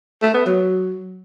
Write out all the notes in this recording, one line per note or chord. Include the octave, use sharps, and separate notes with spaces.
A3
B3
F#3